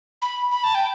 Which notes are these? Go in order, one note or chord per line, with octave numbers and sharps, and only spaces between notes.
B5
B5
A5
G5